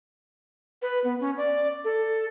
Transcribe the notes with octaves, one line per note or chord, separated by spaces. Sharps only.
B4
B3
C#4
D5
A4